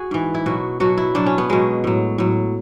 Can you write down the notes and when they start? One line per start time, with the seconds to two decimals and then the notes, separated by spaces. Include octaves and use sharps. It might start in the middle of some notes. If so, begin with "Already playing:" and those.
Already playing: F#4 G#4
0.11 G#2 E3
0.34 E4
0.46 B2 F#3 F#4
0.80 B2 F#3 F#4
0.97 E4
1.15 B2 F#3 D4
1.26 C#4
1.38 B3
1.49 B2 F#3 G#3
1.84 A2 F#3
2.18 A2 F#3